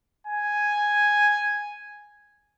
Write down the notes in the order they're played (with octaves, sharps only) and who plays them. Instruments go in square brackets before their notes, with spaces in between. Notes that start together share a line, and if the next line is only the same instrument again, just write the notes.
[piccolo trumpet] G#5